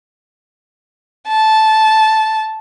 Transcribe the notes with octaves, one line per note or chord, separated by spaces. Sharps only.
A5